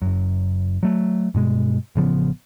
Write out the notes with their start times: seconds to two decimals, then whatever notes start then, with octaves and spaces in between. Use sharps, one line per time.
0.02 F#1 F#2
0.83 F#3 A3
1.34 G2 B2 G#3
1.95 A1 C#3 F3 B3